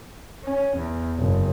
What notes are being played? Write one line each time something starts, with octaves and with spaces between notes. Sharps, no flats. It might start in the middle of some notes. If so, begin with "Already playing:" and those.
C#4
E2
F#1